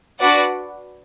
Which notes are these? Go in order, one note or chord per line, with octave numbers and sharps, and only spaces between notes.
D4 F#4 B4 D5 F#5